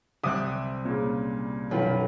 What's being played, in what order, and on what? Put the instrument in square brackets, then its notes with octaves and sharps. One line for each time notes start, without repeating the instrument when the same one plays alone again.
[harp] C2 G3 F#6 [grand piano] E5 D6 D#6
[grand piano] A#2 C#3
[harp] B1 B4 [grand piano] F#2 D#3 F4